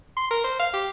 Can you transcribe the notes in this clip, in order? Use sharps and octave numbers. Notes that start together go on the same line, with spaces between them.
C6
A#4
C5
F5
G4